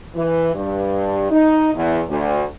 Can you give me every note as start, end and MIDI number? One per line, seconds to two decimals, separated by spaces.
0.15 0.51 52
0.54 1.30 43
1.30 1.69 63
1.74 2.01 40
2.09 2.43 38